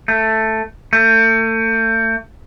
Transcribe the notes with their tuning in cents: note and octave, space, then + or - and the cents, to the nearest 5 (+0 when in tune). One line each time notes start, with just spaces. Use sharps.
A3 +5
A3 +35